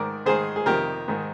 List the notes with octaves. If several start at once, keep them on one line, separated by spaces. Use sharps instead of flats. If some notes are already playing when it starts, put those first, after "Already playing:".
Already playing: G#2 D#3 A#4 D5
G#2 D#3 G#4 C5
G#4
F2 C3 D#3 G4 A#4
G#2 D#3